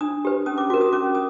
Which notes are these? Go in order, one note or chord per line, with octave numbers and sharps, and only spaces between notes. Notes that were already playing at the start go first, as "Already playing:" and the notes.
D4 D#6
G4 B4
C#4 D#6
D6
F#4 A#4 D6
D#6
C#4 D6
D#6